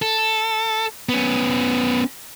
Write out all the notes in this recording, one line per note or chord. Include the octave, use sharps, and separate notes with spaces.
A4
B3 C#4